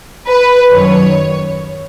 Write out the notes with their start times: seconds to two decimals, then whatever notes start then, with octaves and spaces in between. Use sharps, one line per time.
0.27 B4
0.71 F#2 D#3 F#3 C#5